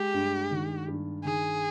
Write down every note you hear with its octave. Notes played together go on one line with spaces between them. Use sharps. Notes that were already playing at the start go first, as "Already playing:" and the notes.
Already playing: G#3 G4
G2
D#3
G2
D#3 G#4